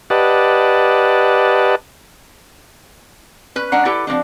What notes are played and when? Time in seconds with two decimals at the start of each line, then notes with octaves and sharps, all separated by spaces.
0.10 G4 B4 D5 D#5 F#5 A5
3.56 C#4 B4
3.72 G#3 C#4 D4 F#5 A#5
3.85 E4 G4 A4 B4
4.07 F3 A#3 C4 D4